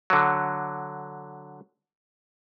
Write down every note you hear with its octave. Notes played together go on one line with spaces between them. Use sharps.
D3 F#3